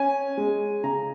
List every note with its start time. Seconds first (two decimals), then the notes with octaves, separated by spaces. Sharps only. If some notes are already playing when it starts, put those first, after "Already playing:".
Already playing: C#4 G#5
0.37 G#3
0.84 C#3 A#5